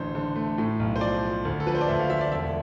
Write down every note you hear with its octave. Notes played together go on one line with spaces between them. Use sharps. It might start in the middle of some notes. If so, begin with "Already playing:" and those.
Already playing: A1 D3 C5
D3
A3
A2
B1
C5
F3 D5
F3
D2
A4
F3 B4
C5
D5
D2 E5
F5
F3 E5
D5
E1 E5